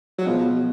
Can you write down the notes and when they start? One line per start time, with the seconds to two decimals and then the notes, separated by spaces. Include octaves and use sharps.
0.18 F#3
0.26 B2 F3 G#3 B3